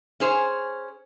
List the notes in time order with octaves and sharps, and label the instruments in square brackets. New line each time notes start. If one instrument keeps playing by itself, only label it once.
[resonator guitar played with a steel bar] C#4 G#4 C5